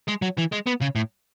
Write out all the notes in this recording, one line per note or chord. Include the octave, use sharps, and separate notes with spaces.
G#3
F#3
E3
G#3
B3
C#3
A2